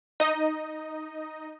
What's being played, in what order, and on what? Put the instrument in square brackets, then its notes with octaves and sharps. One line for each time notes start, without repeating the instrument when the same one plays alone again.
[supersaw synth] D#4 D#5